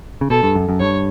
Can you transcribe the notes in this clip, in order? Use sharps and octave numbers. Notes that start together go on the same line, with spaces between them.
C#3
B2 A4
G2
F#2
F#2
G2 C#5